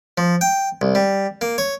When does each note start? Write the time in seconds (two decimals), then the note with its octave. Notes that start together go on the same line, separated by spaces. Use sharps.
0.18 F3
0.41 G5
0.82 C2
0.95 G3
1.41 A#3
1.58 C#5